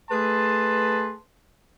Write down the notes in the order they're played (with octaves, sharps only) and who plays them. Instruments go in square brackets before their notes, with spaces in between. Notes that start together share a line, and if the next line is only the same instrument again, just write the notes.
[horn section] A3 G#4 B4 A5 C6